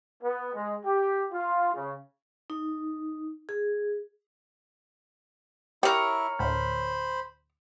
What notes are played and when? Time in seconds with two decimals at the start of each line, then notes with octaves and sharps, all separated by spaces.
0.23 B3
0.54 G#3
0.85 G4
1.31 F4
1.74 C#3
2.50 D#4
3.49 G#4
5.83 E4 G4 A#4 C#5
6.39 D2 A2 C5 B5